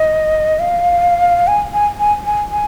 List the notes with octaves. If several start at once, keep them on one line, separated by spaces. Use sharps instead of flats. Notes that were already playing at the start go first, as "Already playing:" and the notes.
Already playing: D#5
F5
G#5
G#5
G#5
G#5
G#5